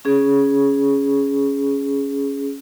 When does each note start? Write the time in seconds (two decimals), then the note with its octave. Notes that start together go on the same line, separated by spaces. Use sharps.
0.05 C#4 G#4